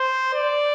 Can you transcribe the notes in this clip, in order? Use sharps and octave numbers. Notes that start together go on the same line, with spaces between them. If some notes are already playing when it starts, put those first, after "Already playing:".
Already playing: C5
D5